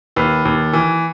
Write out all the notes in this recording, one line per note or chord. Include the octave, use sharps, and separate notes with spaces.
D#2 B4
D#2
E3